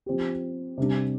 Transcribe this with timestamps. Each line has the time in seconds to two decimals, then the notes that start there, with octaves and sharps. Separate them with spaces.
0.06 F3 C4 G4
0.78 C3 G3 D4